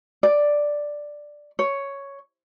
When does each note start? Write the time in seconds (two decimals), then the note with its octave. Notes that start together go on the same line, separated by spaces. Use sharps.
0.23 D5
1.59 C#5